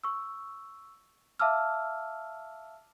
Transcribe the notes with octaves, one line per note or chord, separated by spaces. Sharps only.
C#6 E6
E5 F5 A5 D6 E6 F6